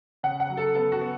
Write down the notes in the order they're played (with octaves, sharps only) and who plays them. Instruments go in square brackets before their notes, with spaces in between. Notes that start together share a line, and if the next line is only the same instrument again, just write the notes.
[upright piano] C#3 F#5
F#5
F#3
A4
B3 A4
F#4
B3